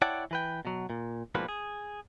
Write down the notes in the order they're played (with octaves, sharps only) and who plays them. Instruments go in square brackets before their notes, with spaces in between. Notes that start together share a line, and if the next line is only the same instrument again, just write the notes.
[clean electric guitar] E4 C#5 D5 F#5 G5 A5
E3 B4 G5
B2 F#3
A#2
G#2 B2 F3 G3 A#3 B4
G#4